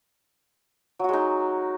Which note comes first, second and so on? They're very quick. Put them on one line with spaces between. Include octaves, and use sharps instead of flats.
F#3 F#4 G#3 D#4